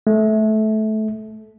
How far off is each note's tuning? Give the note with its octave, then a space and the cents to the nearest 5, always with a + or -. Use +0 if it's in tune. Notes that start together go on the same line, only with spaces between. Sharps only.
A3 -20